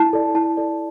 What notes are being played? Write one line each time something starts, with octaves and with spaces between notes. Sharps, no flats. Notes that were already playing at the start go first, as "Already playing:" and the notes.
Already playing: E4 A5
A4 D5
E4 A5
A4 D5